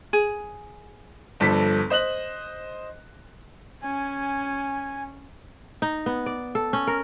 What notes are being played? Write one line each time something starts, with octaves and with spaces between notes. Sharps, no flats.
G#4
G1 G2 F3 A4 B6
C5 D#5 F#6 F#7
C#4 G#5
D#4
B3
D5
A4
C#4
A#4